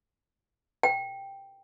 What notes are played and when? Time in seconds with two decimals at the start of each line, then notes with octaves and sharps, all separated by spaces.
0.83 G5